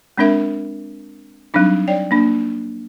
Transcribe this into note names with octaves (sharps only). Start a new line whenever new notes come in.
G#3 C4 D4 A#4 E5
F#3 G3 C4 D4 D#4
C#5 D5 G5
A#3 D4